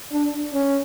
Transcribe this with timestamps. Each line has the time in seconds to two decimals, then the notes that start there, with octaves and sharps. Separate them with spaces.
0.12 D4
0.54 C#4